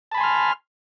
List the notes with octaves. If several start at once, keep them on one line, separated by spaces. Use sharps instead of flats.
G#5 A5 B5 C6 F6